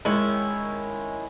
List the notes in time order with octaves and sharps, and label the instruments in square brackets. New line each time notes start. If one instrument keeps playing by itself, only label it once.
[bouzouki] D#3 C#4 E4 [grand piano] G#3